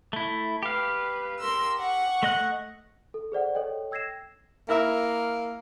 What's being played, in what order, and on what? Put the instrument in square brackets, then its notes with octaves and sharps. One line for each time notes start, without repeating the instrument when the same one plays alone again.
[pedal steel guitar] A3 E4
[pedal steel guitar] G4 F5 [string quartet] B4
[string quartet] A#4 C6 E6
F#5 C#6
[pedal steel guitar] A3 D#5 F#6
[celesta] A4
G#4 C5 D5 F#5
A4 C#5 D#5 G5
G5 E6 G#6 A#6 C7 E7
[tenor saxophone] A#3 [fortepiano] E4 A#4 E5